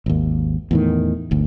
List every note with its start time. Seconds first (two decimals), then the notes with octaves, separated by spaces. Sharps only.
0.06 G#1 D#2
0.71 E2 A2 D#3
1.31 G1 D2